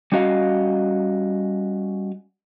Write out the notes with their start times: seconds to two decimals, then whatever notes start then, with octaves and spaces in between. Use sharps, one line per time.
0.12 G3 C#4 F#4 D#5 F5